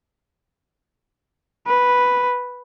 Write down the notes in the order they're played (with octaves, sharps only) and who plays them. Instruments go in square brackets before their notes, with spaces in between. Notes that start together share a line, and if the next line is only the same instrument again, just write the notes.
[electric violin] B4